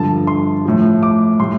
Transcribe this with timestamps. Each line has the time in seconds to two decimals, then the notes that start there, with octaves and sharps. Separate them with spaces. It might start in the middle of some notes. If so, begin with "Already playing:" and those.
Already playing: G2 D3 F3 A5
0.27 C6
0.65 A2 F3
1.03 D6
1.40 A2 G3 C6